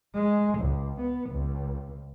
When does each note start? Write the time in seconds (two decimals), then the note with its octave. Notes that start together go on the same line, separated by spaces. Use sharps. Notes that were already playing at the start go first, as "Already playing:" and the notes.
0.15 G#3
0.59 C#2
1.01 B3
1.30 C#2